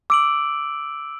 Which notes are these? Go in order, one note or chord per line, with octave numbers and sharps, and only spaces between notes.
D6 E6 D7 F#7